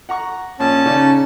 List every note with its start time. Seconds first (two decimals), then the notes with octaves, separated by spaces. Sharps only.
0.09 F#5 A#5 C#6
0.60 A#1 C#4 A5
0.86 C#3 D#4 D5